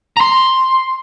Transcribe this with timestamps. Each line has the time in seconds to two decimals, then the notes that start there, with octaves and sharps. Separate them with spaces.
0.17 A#5 C6